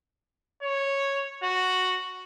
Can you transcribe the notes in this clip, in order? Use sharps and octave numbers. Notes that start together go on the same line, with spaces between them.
C#5
F#4